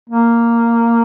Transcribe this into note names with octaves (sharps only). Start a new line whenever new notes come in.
A#3